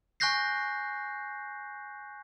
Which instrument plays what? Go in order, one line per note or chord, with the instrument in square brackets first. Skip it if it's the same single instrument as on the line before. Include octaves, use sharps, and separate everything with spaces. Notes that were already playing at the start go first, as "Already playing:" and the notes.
[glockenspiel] G#5 C#6 F#6 G6 A#6 C7